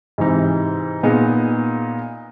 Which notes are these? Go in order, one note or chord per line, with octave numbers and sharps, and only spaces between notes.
G#2 C3 E3 D#4
A#2 B3 D#4 G#4